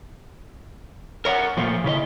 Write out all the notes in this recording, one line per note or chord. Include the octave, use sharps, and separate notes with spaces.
A#4 C#5 E5 F#5
A#2 F3 A3 A#3
C#3 E4 B4 D#5